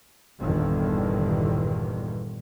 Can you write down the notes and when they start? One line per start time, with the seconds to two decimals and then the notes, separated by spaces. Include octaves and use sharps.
0.39 G1 E2 G2 A#2 D3 D#3